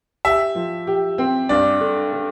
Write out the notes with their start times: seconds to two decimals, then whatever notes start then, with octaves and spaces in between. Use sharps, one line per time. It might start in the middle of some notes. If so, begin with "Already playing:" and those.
0.25 G4 E5
0.55 F3
0.87 G4
1.18 C4
1.49 G2 D5
1.81 D3
2.13 D3